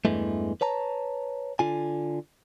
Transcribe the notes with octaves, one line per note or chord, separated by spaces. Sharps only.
E2 G2 E3 G#3 A3
B4 C#5 A5 A#5
D3 F4 G#5